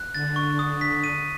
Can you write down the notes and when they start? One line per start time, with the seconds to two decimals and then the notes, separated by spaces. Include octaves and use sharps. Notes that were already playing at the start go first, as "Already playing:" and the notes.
Already playing: F#6
0.13 D3 A6
0.36 C#6
0.59 D#6
0.81 B6
1.04 D#7